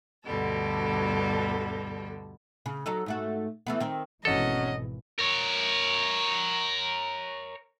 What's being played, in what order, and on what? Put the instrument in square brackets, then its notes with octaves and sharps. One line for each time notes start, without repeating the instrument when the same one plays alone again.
[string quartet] D2 G2 B2 D3 G3 A4
[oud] C#3
F#3 D#4 A4
G#2 A3 F#4
E3 A3 B3
D#3 C4
[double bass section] G#1 B2 E3 [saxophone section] F#3 C#4 [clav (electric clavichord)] A4 [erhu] D#5
[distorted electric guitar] A#4 C#5